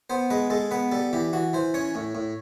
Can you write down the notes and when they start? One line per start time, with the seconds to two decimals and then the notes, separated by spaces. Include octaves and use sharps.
0.10 B3 C5
0.30 G#3 B4
0.50 G#3 A4
0.71 B3 B4
0.91 G3 A4
1.13 E3 G4
1.33 E3 F#4
1.53 E3 C5
1.74 C#4 C#5
1.95 A2
2.15 A2